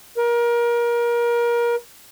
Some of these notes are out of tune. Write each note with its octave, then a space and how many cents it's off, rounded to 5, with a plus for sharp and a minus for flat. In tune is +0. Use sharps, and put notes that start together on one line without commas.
A#4 +30